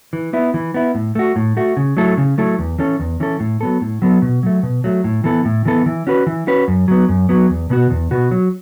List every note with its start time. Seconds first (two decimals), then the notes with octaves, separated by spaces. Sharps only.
0.13 E3
0.33 B3 E4
0.54 E3
0.74 B3 E4
0.95 A2
1.15 A3 F#4
1.36 A2
1.57 A3 F#4
1.77 C#3
1.97 F#3 A3 E4 A4
2.17 C#3
2.38 F#3 A3 E4 A4
2.59 E2
2.79 E3 C#4 A4
3.00 E2
3.20 E3 C#4 A4
3.40 A2
3.61 F#3 B3 A4
3.81 A2
4.02 F#3 B3 A4
4.22 B2
4.43 F#3 A3
4.63 B2
4.84 F#3 A3
5.04 A2
5.24 E3 B3 A4
5.45 A2
5.65 E3 B3 A4
5.86 E3
6.07 C#4 F#4 B4
6.27 E3
6.47 C#4 F#4 B4
6.68 F#2
6.88 F#3 B3
7.09 F#2
7.29 F#3 B3
7.50 E2
7.70 B2 B3 F#4
7.91 E2
8.11 B2 B3 F#4
8.31 F#3